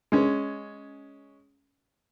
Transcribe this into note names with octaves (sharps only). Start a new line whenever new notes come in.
G#3 C#4